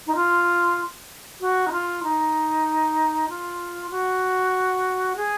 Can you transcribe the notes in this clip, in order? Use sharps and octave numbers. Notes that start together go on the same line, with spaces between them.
D#4
F4
F#4
D#4
F4
D#4
F4
F#4
G#4